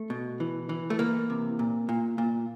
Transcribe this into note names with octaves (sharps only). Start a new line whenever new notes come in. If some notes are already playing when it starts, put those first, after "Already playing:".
Already playing: A3
B2
E3
E3
A3
E3 A#3
C3
A#2
A#2
A#2